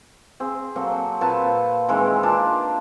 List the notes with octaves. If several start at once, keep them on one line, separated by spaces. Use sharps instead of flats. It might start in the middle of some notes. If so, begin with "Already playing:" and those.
C4 G#4
F#3 A#3 C4 A4
A#2 C4 B4 A5
D#3 E3 G#3 C4
A#3 D4 F4 A5